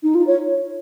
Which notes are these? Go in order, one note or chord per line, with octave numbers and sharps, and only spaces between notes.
D#4
F4
C#5